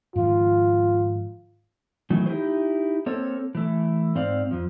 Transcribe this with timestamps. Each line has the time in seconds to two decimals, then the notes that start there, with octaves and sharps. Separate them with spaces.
0.16 G#2 D#3 F3 F4
2.10 D#3 E3 F#3 A3
2.26 D#4 E4 G4 G#4 C5
3.06 A#3 C4 A4 C#5
3.55 E3 A3
4.15 G#2 C4 D5 F5
4.51 F2 F3